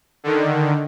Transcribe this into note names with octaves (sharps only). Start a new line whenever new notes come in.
D3 D#3